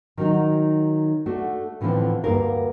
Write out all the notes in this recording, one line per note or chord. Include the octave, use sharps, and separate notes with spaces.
D#3 F#3 D#4
A3 D4 F#4
A2 D3 E3 F3 C4 D4
D2 G2 A#3 A#4 F5